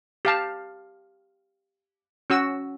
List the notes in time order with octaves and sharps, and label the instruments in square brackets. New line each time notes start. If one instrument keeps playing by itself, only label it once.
[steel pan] G4 F5 A5
C#4 F#4 E6